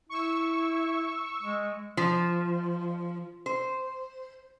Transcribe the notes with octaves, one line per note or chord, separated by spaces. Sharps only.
E4 C#6 E6
G#3
F3
C5